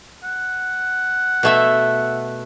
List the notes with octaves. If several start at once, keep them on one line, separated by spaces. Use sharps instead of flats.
F#5
B2 A3 E5